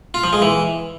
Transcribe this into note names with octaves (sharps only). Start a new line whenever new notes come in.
F4
F3
G#3
E3